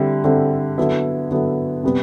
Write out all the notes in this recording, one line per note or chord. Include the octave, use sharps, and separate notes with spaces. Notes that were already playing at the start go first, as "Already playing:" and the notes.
Already playing: D3 G3 C4 E4
D3 G3 C4 E4
D3 F#3 B3 E4
D3 F#3 B3 E4
C3 G3 B3